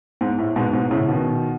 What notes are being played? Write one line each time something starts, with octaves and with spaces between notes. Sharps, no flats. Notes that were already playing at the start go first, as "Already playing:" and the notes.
G#2
A2
G#2 B2
G#2 B2
A2 C#3
B2 D#3